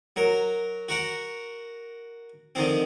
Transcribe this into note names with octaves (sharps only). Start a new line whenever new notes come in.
F#3 A#4
F#4 A#4 F#5
D3 D#3 F3 C4